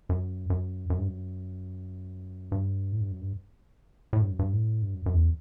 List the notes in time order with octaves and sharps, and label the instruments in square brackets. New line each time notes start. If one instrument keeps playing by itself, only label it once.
[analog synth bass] F#2
F#2
F#2
G2
F#2
G2
A2
G2
F#2
G2
A2
G2
F#2
G2
A2
G2
F#2
F#2
E2